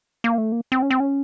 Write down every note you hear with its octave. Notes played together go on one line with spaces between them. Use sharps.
A#3
A3
A#3
C4
C#4
C4
C#4